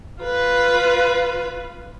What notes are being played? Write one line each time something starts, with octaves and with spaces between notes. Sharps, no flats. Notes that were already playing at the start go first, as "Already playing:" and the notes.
F4 B4